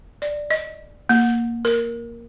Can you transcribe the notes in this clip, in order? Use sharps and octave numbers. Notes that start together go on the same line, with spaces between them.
D5
D#5
A#3
A#4